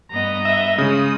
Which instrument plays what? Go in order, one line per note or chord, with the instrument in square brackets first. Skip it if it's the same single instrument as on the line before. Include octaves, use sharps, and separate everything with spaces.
[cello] G2 B3 [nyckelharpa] D#5 A#5
[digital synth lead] E5
[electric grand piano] C#3 [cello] G#3 [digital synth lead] D#6